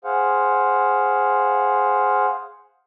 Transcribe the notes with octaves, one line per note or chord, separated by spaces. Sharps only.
G#4 C5 F5 F#5